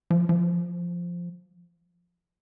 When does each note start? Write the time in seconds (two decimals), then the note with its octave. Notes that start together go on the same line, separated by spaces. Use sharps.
0.10 F3
0.29 F3